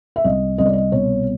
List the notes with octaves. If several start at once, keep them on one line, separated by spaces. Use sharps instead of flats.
E5
C2 D#5
C2 D#5
D5
D#5
B2 C#5